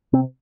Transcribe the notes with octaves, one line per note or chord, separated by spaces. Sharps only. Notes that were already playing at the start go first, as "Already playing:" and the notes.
C3 C4